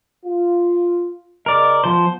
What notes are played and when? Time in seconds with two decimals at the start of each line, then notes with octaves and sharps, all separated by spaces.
0.25 F4
1.46 C#3 A#4 D5 D#5
1.84 F3 B3 C5